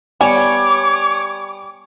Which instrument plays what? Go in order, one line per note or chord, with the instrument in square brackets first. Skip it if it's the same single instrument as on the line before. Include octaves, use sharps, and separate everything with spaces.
[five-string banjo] G3 [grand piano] B3 D5 G#5 [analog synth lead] C#5 [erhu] D6